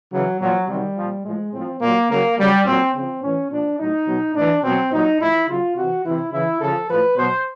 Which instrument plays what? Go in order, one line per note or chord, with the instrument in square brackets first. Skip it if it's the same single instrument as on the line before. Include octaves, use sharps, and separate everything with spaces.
[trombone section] C#3 E3 F#3
A#2 F3 F#3
C3 D#3 F#3 G3
A#2 F3
A2 F3 G#3
A2 F3 C4
A#2 F#3 A#3
C#3 F#3 A#3
C#3 F#3 G3
A#2 F#3 C4
C#3 F3 C4
A2 E3 C#4
A#2 F3 D4
A2 F#3 D#4
B2 F#3
A2 E3 D4
B2 F#3 C4
A#2 F#3 D#4
A2 F3 E4
C#3 F#3 F4
C3 E3 F#4
C3 E3 E4
C#3 E3 E4
C#3 F3 A4
A2 F3 B4
B2 F#3 C5